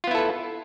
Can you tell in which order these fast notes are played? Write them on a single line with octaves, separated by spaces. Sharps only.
F4 B3 E4 A4 B4